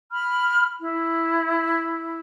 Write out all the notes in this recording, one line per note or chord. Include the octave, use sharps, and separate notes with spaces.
B5 F6
E4